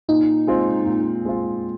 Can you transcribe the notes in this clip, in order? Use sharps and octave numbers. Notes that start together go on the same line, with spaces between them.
A#2 D#4
G#3 C4 F4
A#2
G#3 C4 F4